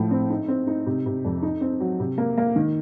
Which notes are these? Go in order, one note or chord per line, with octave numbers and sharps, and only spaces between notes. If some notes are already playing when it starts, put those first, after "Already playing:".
Already playing: A2 F3
C4
D#4
C4
D#4
C3
C3
F2
D#4
C4
F#3
C3
A#3
A#3
D#3